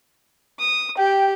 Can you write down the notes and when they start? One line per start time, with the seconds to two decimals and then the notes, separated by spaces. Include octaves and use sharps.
0.60 D#6
0.98 G4 G5